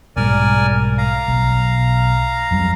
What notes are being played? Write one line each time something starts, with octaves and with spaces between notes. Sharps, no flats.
B1 G#2 G3 A#4 D5 G#5
F5 A#5
B1
F2 F#3 G3